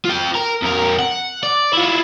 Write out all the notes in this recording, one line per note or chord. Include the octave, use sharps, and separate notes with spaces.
F4 G5
A#4
F2 A#4
F#5
D5
E4 F4